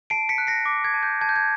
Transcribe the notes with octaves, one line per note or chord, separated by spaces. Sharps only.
A5 C7 D7
B6 C#7
F#6
A#6 C7
D6
G#6
A5
G6
A5 G#6
G6
G#6